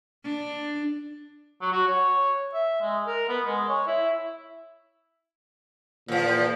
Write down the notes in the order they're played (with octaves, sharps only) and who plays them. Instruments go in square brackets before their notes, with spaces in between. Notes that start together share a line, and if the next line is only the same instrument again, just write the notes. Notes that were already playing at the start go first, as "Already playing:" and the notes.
[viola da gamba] D4
[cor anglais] F#3
F#4
C#5
E5
G#3
A#4
B3
G#3
C#5
E4
[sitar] E2 F3 [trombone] A#2